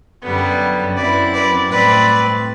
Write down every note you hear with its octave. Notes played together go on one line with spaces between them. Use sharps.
F#2 D3 G3 B3
F#2 F#3 C4 E4 B4 D5
B4 D5
A2 G3 C4 B4 D5